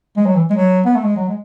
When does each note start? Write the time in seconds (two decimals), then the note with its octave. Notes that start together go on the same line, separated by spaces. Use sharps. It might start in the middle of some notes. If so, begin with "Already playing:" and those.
0.17 G#3
0.26 F#3
0.36 E3
0.50 G#3
0.54 F#3
0.86 B3
0.96 A3
1.04 G#3
1.17 F#3
1.29 G#3